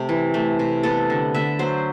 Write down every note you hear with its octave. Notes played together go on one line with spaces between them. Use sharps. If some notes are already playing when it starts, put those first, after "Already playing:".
Already playing: C3 A3 G4
E3
A3
C3
B3 A4
D3
D3 E5
F#3 C5